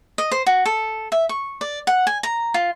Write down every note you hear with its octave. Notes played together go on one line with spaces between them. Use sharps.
D#5
C5
F#4
A4
E5
C#6
D5
F#5
G#5
A#5
F4